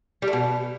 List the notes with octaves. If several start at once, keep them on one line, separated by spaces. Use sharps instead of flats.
G3
A3
B2